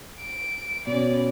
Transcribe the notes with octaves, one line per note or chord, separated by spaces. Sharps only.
D7
B2 C#4 D5